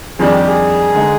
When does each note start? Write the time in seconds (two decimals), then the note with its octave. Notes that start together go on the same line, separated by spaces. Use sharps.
0.19 F2 D#3 G3 D4 G#4
0.33 G4
0.47 G#4
0.95 D3 G#3 D#4